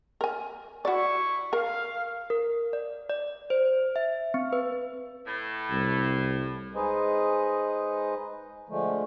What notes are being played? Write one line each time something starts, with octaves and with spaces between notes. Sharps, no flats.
A#4 G#5
E4 F#4 D5 C#6
A#4 F5
A#4
D5
D5
C5
E5
C4
B4
A2
C2
G#3 D#4 G#4 B4 C5 D#5
D3 F3 G#3 A3